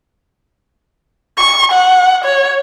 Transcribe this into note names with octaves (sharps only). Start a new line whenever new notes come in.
C#6
F#5
C#5